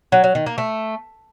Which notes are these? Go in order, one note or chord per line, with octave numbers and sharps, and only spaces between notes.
F#3
F#3
D#3
A#3
A3